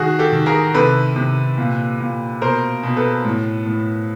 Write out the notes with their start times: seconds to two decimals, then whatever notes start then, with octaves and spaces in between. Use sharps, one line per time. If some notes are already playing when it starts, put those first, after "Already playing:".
Already playing: D#3 F#4 G#4
0.19 G4 A4
0.32 D#3
0.46 G#4 A#4
0.74 C3 A4 B4
1.16 C3
1.58 A#2
2.00 A#2
2.41 B2 A#4 C5
2.83 B2
2.97 A4 B4
3.25 A2
3.66 A2